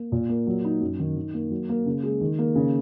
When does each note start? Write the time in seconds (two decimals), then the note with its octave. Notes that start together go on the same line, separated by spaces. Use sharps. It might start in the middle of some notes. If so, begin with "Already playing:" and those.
Already playing: A#3
0.12 A#2
0.29 A#3
0.47 F#3
0.64 D#4
0.81 F#2
0.99 D#3
1.17 D#3
1.34 A#3
1.51 F#3
1.69 A#3
1.86 C#3
2.03 G#3
2.21 D#3
2.38 A#3
2.55 C#3